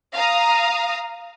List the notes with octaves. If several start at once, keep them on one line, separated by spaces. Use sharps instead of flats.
F5 A#5 D#6